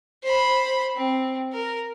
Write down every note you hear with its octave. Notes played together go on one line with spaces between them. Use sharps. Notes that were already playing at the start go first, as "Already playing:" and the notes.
C5 B5
C4
A#4